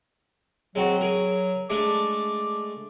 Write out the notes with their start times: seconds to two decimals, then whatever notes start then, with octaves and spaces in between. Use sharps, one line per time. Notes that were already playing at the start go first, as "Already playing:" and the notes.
0.75 F#3 G#3 C4 F#4
1.01 G#4 A#4
1.70 G#3 A3 D4 D6